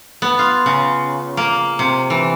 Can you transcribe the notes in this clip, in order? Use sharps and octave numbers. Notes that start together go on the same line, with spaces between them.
B3
F4
C#3
A#3
C3
E3